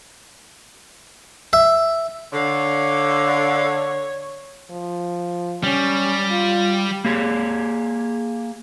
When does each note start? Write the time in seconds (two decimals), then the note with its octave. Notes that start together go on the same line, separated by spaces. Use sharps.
1.53 E5
2.33 D3 C#5 F5
4.70 F3
5.63 G3 C#4
6.30 F4
7.05 A#3 G4 G#4